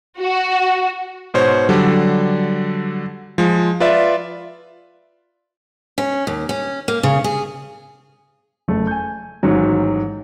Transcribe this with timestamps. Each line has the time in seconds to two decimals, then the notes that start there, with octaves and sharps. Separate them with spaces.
0.19 F#4
1.34 G#2 B2 C5 C#5
1.69 D3 F#3 G3 A4
3.38 F3 G#3
3.80 F4 B4 D5 E5
5.98 C#4
6.27 D#2
6.49 C#4
6.88 A#3
7.03 C#3
7.24 G#4
8.68 F#1 A3
8.87 G#5 G6
9.43 A1 G#2 D#3 F#3